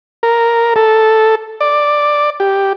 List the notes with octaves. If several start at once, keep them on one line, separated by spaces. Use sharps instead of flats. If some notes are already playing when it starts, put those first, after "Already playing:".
A#4
A4
D5
G4